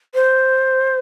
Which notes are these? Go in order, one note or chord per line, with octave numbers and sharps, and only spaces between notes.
C5